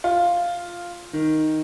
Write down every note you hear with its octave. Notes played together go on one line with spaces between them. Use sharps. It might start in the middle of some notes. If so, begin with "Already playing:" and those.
F4
D#3